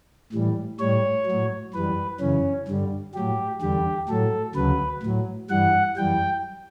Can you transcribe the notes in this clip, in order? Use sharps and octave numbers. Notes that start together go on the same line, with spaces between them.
A2 E3 G3
A2 G3 C#5
F#3
A2
F#2 E3 G3 B4
F#2 C#3 E3 C#4
G2 D3 G3
A2 F#3 G4
E2 D3 G3 G4
A2 F#3 A4
D2 C#3 F#3 B4
A2 F#3
G2 E3 G3 F#5
F#2 E3 G3 G5